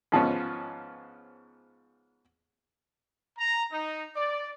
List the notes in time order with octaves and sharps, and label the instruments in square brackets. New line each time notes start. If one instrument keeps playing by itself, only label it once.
[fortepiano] G#2 F3 B3 C#4
[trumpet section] A#5
D#4
D5